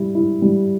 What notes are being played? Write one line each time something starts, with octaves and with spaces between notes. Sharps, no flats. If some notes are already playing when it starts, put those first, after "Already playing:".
Already playing: G3 E4
E4
G3